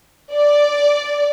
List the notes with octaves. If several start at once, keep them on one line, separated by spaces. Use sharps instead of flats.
D5